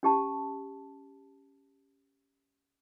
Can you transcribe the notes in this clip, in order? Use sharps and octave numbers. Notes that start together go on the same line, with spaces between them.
C#4 G4 A5